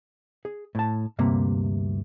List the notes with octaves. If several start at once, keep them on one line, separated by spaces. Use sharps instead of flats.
G#4
A2 A5
D2 G2 C3 A#3